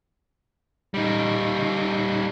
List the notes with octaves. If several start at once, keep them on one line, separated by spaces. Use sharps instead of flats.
G3 D#4